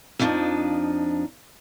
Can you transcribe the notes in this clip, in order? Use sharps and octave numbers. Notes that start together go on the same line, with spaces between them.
F2 F3 B3 C4 D4 D#4